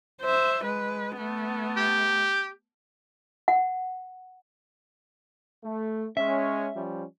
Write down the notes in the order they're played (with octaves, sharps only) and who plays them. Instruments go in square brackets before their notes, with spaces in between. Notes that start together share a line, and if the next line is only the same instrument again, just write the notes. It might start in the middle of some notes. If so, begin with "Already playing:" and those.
[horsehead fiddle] C5 E5
G#3 B4
A3 B3
[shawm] G4
[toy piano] F#5
[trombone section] A3
[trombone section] G#3 C#4 [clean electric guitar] E5
[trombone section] F3 G3 C#4